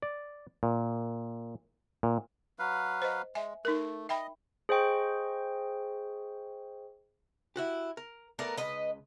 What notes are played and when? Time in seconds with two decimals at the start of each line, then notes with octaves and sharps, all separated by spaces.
0.02 D5
0.63 A#2
2.03 A#2
2.59 F#3 B4 F5
3.02 C5 D#5
3.35 G#3 E5 G#5
3.65 A3 D#4 A#4
4.09 D#5 E5 G5 B5
4.69 G#4 C5 D#5 G5 C#6
7.56 E4 F#4 G4
7.97 A#4
8.39 A3 B3 A#4 D5
8.57 C#2 B4 D#5